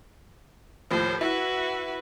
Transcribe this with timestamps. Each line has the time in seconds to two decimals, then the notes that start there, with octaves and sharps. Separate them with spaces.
0.91 D#2 A2 F3 C5
1.21 E4 F#4 B4